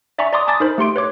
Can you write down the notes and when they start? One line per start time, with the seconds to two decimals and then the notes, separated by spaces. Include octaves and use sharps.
0.18 D5 E5 G#5 A#5 C#6
0.33 D5 A#5 C6 D6 D#6
0.47 G#5 A5 D6 D#6 A6
0.60 D#4 A#4 C5 B5
0.78 A3 G4 C6 D7
0.96 B4 C#5 D6